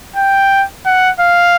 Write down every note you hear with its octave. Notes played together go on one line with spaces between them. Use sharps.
G5
F#5
F5